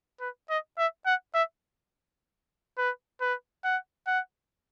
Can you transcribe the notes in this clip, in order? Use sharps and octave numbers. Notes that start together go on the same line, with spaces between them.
B4
D#5
E5
F#5
E5
B4
B4
F#5
F#5